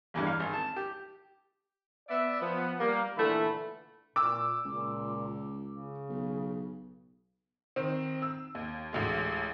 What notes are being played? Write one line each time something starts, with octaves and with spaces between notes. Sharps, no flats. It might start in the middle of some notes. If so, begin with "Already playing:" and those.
A1 E2 G2
F5
G#1
A5
G4
B3 D5 E5
F3 B3
G3 A#3
A#2 D3 E3 A3 E5 B5
A#2 D6 E6
C#2 A#2
C#3
B1
D#3 C4
E6
D#2
A1 D2 G#3